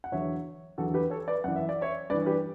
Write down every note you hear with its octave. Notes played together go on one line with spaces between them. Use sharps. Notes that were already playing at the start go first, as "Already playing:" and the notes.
F#5
E2 D3 F#3 C#5 E5
E2 D3 F#3 F#4 A4
G4 B4
A4 C#5
B4 D5
F#2 E3 F#5
E5
D5
C#5 E5
G2 E3 B4 D5
G4 B4